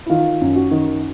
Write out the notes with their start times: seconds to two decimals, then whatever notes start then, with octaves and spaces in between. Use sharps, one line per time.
0.06 E4
0.10 D#3 F4
0.41 F#2
0.56 F#4
0.71 D#3